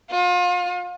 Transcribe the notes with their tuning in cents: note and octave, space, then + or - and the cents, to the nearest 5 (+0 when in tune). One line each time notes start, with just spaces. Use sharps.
F4 +35